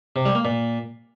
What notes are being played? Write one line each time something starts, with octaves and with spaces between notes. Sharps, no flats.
C3
G3
A#3
A#2